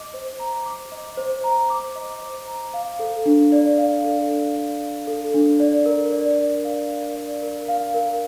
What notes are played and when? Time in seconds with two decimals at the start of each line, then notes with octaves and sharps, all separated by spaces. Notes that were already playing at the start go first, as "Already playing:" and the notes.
Already playing: D#5 D6
0.14 C5
0.39 A#5
0.66 D6
0.92 D#5
1.17 C5
1.44 A#5
1.70 D6
1.96 D#5
2.21 C5
2.47 A#5
2.74 F5
2.99 A4
3.26 D4
3.52 D5
3.78 F5
4.04 A4
4.30 D4
4.56 D5
4.82 F5
5.07 A4
5.34 D4
5.60 D5
5.86 A#4
6.12 D5
6.38 A#4
6.65 F5
6.90 A#4
7.16 D5
7.42 A#4
7.68 F5
7.94 A#4